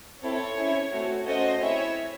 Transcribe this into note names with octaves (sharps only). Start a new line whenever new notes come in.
C4 E4 A4 C#5
C#4 E4 G#4
A3 C4 F#4
A3 C#4 F#4 A4 C5 D#5
C4 E4 G#4 C#5 E5